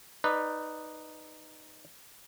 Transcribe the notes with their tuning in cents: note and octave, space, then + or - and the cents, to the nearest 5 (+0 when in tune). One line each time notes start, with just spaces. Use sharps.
D#4 -5 B4 +0 D5 +10